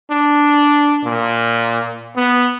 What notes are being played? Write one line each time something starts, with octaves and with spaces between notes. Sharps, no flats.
D4
A#2
B3